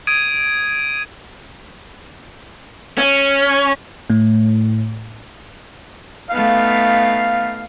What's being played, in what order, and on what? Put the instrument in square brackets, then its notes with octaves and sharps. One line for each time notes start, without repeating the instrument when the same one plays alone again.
[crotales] D#6 G#6 D7 D#7
[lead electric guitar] C#4
[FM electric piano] A2
[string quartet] A3 B3 D#4 [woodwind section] F5